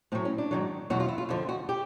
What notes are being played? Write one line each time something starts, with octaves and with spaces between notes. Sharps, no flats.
A2 F#3 C4
C#4
D4
G#2 D#3 F#3
E2 B2 F#3 F#4
F4
E4
F4
F2 D3 F3
F#4
G4